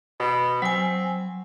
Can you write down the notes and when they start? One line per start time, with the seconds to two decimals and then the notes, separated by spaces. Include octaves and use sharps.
0.20 B2
0.62 F#3 C4 G#5